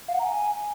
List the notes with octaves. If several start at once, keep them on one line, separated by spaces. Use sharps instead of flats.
F5
F#5
A#5
G#5